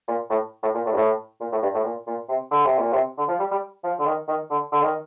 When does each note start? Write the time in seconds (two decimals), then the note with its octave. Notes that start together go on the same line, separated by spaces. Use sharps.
0.08 A#2
0.30 A2
0.63 A2
0.74 A#2
0.86 A2
0.93 G2
0.96 A2
1.41 A#2
1.52 A2
1.63 G2
1.74 A2
1.84 A#2
2.07 A#2
2.29 C3
2.51 D3
2.65 C3
2.79 A#2
2.93 C3
3.18 D3
3.28 F3
3.39 G3
3.51 G3
3.84 F3
3.99 D3
4.06 D#3
4.28 D#3
4.51 D3
4.72 D3
4.82 D#3